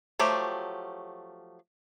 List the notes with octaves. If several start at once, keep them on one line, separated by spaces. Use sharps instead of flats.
F3 F#3 A3 G4